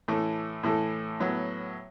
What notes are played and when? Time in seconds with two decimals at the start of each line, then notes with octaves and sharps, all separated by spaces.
0.08 A2 E3 A3
0.63 A2 E3 A3
1.20 A2 F#3 B3 F#4